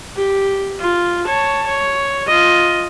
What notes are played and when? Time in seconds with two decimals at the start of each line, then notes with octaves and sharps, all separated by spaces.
0.15 G4
0.80 F4
1.25 C#5 A5
1.66 C#5
2.27 F4 D#5